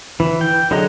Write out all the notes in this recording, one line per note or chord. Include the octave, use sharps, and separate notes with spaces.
E3
G5
D3 F#3 G#4 D#5 A#5